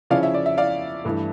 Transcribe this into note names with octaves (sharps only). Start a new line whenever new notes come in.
C#3 F3 C#4 E4 D5 F5
E5
D5
E5
D5 F5
G2 E3 A3 E4